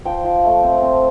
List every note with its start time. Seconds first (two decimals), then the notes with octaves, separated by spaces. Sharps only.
0.05 F3 G5
0.24 F3
0.45 A3
0.63 C4
0.82 C4